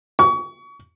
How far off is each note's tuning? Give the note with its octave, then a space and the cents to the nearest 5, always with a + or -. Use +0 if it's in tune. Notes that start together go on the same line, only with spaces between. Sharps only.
C#6 +30